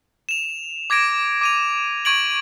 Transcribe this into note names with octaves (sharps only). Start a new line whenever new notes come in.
E7 F7
D6 G#6 A#6 D7
D6 D#7 F7
C#6 G#6 D7 F#7